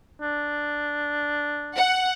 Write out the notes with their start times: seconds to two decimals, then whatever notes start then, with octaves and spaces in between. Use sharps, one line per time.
0.21 D4
1.75 F#5